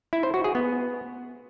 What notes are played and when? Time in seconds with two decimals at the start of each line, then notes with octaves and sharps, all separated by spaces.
0.13 E4
0.23 C5
0.34 F#4
0.44 G#4
0.55 B3